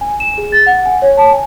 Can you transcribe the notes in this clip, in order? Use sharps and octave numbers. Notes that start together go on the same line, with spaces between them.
G#5
E7
G#4
A6
F#5
G#5
C#5
A5
G#5